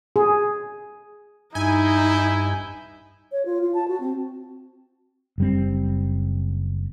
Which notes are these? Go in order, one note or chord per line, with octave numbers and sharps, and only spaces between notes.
G#4
G2 D#4 E4 G#5 G6
C#5
F4
F4
A5
F#4
C4
F#1 G3 C4